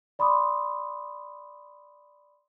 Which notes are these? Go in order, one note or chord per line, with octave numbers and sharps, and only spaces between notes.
D5 B5 C6 D6 D#6